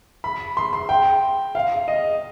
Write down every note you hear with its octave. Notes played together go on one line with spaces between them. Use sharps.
B5
C6
C6
G5
F5
D#5